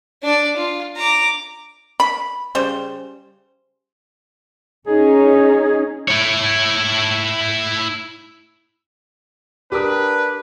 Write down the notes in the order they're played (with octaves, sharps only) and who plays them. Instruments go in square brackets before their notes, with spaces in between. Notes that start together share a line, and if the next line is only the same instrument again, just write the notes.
[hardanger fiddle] D4 D5
F4
A#5 D6
[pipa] B5
C#3 G3 C5
[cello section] C#4 D#4 [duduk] G#4
[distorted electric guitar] E4 C#5
[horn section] D4 B4 [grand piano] G4 A#4 D#6